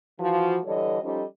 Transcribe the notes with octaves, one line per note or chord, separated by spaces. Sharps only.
E3 F3 F#4
D3 E3 G3 A4 C#5 D#5
F3 G3 C#4 D#4 A4 D#5